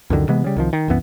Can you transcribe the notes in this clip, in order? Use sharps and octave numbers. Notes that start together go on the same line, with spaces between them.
C#2 F#2 D3 D#3
C3 E3 G#3 B3
C#3 G3
C2 D#3 F3
D#3
C2 F#2 E3 B3